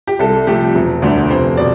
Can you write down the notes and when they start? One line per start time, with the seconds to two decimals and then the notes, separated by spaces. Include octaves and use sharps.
0.07 G4
0.19 C2 A4
0.47 C3 F3 A3 G4
0.75 E1
1.02 D2 D3 A3 D4
1.30 F1 C5
1.57 B2 D5